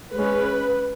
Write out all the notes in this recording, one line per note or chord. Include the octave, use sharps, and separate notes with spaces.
G#3 C#4 B4